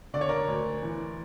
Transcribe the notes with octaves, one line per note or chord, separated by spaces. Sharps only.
D3 D5
C#5
A#4 D5
D2
E3